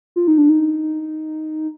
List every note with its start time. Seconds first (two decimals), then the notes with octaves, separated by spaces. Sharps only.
0.16 F4
0.27 D#4
0.38 D4
0.49 D#4